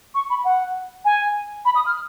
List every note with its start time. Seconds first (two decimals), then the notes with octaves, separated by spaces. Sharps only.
0.15 C#6
0.30 B5
0.45 F#5
1.05 G#5
1.65 B5
1.75 D#6
1.86 F6